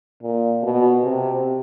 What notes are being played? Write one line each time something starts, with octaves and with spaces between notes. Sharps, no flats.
A#2
B2
C3